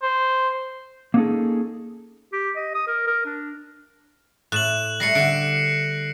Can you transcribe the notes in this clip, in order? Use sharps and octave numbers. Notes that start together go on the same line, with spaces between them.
C5
A#3 B3 C#4 D#4 G#4 A4
G4
D#5
D#6
A#4
A#4
D4
A2 F#6 E7 F#7
G3 A3 A#6 C7 C#7
D3 G4 C7 D7